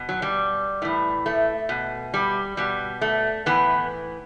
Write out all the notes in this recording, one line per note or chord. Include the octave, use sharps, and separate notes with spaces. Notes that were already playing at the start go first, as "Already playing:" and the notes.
Already playing: B2
F#3
G3
A2 E3
A3
B2
G3
B2 G3
A3
A2 E3 B3